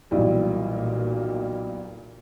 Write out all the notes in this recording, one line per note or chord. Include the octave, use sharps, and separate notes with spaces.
B1 A#2 E3 G3